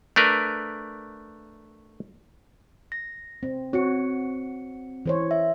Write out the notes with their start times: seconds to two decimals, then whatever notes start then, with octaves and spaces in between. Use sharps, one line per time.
0.16 A3 D4 A#4 B4
2.92 A#6
3.43 C4
3.73 C4 F#4 C#5 C#7
5.06 E3 C5 C#5
5.31 E5